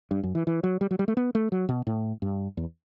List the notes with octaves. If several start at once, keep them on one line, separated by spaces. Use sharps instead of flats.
G2
F#2
E3
E3
F#3
G3
F#3
G3
A3
B3
A3
F#3
B2
A2
G2
E2